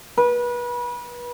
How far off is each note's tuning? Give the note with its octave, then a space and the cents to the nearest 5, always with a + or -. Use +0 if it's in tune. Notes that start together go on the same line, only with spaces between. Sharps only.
B4 -30